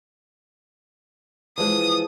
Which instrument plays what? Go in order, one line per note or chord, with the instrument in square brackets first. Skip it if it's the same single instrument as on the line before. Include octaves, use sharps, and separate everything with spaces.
[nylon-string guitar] E3 F3 G#3 [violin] D#6